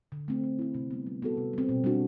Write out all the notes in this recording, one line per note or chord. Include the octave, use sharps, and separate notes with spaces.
D3
A3 C4
A3
C4 E4
C3
G3 B3
G3
B3 F#4 A4
C3
G3 C4
B2
G3 D4 F#4